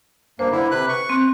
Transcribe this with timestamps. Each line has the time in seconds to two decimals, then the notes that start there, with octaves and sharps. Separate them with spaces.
0.39 G2 A#3 C5
0.52 D3 E4
0.71 C3 B4 F#6
0.89 C#6
1.09 C4 F#6